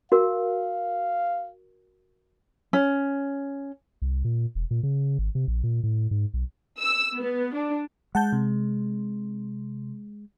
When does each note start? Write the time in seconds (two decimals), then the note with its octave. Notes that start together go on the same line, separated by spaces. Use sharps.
0.12 F#4 A#4 F5
2.73 C#4
4.02 C2
4.25 A#2
4.55 E1
4.71 A#2
4.83 C#3
5.19 G#1
5.35 C3
5.48 A#1
5.63 A#2
5.83 A2
6.11 G#2
6.34 B1
6.79 E6
7.16 B3
7.54 D4
8.15 G#3 F#5 A5 G6
8.33 C3